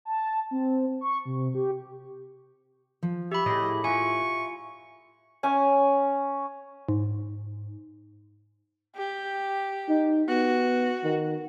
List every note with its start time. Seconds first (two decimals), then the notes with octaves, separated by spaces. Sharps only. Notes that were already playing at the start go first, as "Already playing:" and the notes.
0.05 A5
0.51 C4
1.01 C#6
1.25 C3
1.54 G4
3.03 F3
3.32 G4 E5 B5
3.46 A2 E4 G#4 D#5
3.84 F4 E5 G#5 C#6
5.43 C#4 C#5 G#5
6.89 G#2
8.96 G4
9.89 D#4
10.28 B3 F#4
11.03 D#3